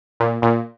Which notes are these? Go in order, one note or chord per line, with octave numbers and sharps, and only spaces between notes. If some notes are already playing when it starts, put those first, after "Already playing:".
A#2
A#2